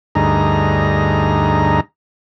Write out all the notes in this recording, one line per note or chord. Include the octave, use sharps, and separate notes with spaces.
D2 G2 D#4 G#4 A#5